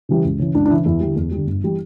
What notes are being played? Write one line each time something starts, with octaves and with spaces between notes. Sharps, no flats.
C#3 E3 G3
C#2
C#3 E3
C#2 D4
D4
C#3 E3 E4
E2 E4
D3 G3
E2
G3
D3
G1
E3 G3